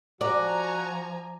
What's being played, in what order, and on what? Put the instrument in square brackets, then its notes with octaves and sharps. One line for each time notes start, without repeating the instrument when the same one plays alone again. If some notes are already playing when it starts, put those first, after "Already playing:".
[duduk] F3 [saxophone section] F#4 [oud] D5 [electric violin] G#5 A#5